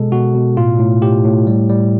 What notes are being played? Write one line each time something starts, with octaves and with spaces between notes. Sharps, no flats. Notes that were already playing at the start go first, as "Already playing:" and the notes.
Already playing: B2 G#3 A4
B2 F#4
B2
A2 F4
A2
A2 G4
A2
G3
G3